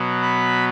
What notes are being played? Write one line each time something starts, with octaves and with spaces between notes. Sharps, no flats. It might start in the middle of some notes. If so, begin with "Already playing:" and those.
Already playing: B2 F#3 B3
B5